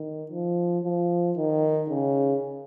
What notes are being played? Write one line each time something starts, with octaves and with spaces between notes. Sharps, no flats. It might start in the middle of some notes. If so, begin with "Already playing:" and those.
Already playing: D#3
F3
F3
D#3
C#3